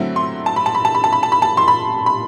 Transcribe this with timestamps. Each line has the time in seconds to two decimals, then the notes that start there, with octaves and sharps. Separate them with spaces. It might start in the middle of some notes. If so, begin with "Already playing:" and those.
Already playing: D3 F#3 A3 C4 E4
0.16 C6
0.46 A5
0.56 B5
0.66 A5
0.75 B5
0.85 A5
0.95 B5
1.04 A5
1.13 B5
1.23 A5
1.32 B5
1.42 A5
1.57 C6
1.68 B5
2.06 B5